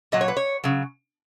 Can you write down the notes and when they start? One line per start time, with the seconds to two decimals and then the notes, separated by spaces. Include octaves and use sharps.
0.12 A#2 F#3 D#5
0.21 C#5
0.28 B4
0.37 C#5
0.64 C#3 F#3